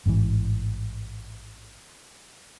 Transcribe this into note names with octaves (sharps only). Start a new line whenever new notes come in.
A1 G#2 B2 E3